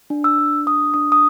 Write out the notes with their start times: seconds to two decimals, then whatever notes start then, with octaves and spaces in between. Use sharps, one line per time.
0.10 D4
0.24 E6
0.38 D4
0.66 D4 D#6
0.94 D4 D#6
1.12 D#6